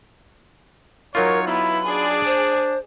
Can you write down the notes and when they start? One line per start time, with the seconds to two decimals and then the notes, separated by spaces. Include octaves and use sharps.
1.15 F#3 D#4 F4 A#4 C#5
1.47 B3 E4 B5
1.86 D4 G#4 D5
2.25 C5